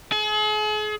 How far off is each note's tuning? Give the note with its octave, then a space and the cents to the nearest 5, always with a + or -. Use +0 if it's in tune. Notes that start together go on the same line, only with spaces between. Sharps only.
G#4 +40